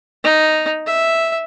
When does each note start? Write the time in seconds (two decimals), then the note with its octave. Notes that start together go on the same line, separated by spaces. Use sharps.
0.24 D#4
0.87 E5